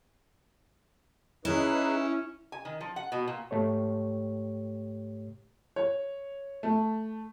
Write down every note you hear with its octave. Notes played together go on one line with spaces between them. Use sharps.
C#4 D#4 E4 G#4 B4
G#5
D#3
F3
F#5
B2
A#2
G#2 A3 G4 C#5
C#5
A3